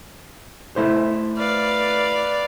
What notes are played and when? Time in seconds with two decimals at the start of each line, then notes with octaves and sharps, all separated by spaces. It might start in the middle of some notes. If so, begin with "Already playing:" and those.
0.76 A3 E4 C5
1.38 B4 D5 F5